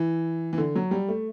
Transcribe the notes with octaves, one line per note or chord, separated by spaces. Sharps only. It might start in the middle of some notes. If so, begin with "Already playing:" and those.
Already playing: E3
E3
D3
F#3
G3
A3